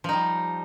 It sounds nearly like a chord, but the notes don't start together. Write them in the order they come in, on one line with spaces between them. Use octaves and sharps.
F3 D#4 G3